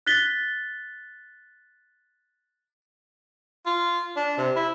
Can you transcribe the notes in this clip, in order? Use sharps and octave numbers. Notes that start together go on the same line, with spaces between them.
F#6 A6 B6 G7
F4
D4
C3
E4